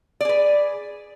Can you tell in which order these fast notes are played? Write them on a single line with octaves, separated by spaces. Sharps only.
D5 G#4 B4